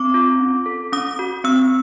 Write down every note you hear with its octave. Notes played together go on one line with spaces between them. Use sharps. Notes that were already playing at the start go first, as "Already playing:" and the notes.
Already playing: C4 D6
F4
C#4
A4
C#4 D#6
F#4
C4 E6